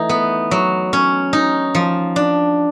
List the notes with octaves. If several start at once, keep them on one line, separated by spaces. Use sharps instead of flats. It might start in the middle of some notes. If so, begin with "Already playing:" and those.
Already playing: E3 A3 D#4
B3
F#3
C#4
D#4
F3
D4